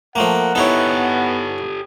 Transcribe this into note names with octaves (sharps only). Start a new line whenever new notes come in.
F3 A3 A#3 A#4 F#5
B3 D#4 E4 G4 A4 C#5